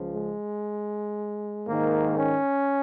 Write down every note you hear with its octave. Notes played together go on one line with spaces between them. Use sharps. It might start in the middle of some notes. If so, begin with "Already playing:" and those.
Already playing: C#2 C#3 F3
G#3
G#2 D#3 A#3
C#4